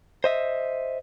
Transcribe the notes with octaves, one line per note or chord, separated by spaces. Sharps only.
C5 D#5 E5